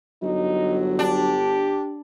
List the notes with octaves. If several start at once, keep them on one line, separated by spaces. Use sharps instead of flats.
G1 F#3 D#4
D4 G4